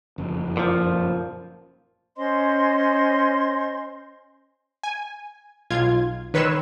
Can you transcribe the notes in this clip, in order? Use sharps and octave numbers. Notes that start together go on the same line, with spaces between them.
F#1 F2
A#2 F3
C#4 C5 D#5 C6
G#5
B1 F4 G#6
D#3 B4 C#5 C6 E6 E7